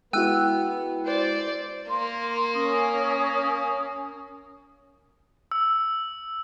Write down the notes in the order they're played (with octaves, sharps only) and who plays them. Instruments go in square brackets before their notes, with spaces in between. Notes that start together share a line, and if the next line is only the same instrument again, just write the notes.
[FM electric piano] G#3 E4 F#4 [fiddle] B3 [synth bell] G5 E6 F#6
[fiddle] C5 D5
[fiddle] A#3 [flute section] C6
[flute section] C#4 D#6
[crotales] E6